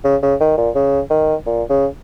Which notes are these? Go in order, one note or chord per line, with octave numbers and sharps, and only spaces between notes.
C#3
C#3
D#3
A#2
C#3
D#3
A#2
C#3